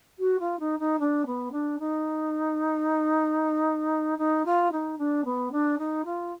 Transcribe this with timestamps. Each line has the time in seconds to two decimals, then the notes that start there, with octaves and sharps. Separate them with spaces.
0.19 F#4
0.39 F4
0.59 D#4
0.79 D#4
0.99 D4
1.26 B3
1.51 D4
1.79 D#4
4.18 D#4
4.45 F4
4.71 D#4
4.98 D4
5.24 B3
5.52 D4
5.78 D#4
6.05 F4